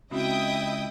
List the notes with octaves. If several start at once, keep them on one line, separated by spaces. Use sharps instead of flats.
C#2 C4 C#4 E4 F#4 D#5 G5 D#6